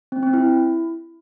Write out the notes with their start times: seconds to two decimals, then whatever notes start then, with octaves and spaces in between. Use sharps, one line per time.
0.12 C4
0.23 C4
0.34 E4